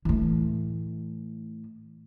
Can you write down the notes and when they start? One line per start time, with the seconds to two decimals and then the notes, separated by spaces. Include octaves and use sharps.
0.05 A2 E3